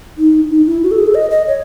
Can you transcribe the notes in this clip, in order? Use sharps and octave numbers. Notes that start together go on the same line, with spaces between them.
D#4
D#4
E4
F#4
A4
G#4
A4
D#5
D#5
C#5